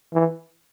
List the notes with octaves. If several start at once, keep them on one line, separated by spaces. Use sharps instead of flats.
E3